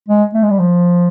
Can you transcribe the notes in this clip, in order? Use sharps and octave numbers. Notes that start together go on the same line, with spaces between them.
G#3
A3
G#3
G3
F3